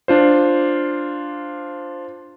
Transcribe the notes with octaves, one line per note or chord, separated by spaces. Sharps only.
D4 F4 C5